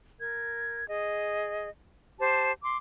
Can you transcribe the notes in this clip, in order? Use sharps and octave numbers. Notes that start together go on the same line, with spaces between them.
A#4 G#6
G#4 D#5
G4 C5 A5
C6 D6